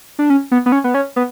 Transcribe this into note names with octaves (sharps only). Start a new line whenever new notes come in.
D4
C#4
B3
B3
C#4
B3
C#4
B3